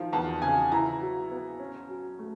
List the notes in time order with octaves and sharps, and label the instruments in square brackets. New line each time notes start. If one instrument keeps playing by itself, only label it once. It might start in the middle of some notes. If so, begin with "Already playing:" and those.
Already playing: [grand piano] D#3 F3 [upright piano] F5
[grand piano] E2 [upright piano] A5
[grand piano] C#3 [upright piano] G#5
[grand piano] E4 [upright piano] A#5
[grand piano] F#3
B3
C#4
F#3
A3